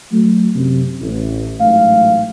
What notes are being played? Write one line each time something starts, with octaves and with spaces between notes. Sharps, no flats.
F#3 A3
F#2 C3
A1
A1 G#2 F#3 A3 F5